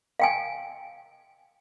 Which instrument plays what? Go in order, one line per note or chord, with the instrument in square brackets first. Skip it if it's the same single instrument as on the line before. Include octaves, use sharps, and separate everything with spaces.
[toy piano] F5 G5 G#5